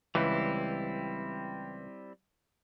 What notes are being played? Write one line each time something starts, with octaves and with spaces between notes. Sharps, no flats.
C#2 E3 G3 C4 E4